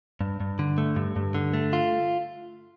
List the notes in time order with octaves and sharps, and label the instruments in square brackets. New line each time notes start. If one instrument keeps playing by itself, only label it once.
[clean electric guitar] G2
G2
D3
A3
G2
G2
D3
A3
F4